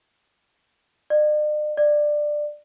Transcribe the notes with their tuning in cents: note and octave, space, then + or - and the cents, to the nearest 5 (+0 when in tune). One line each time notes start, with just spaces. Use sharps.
D5 +45
D5 +15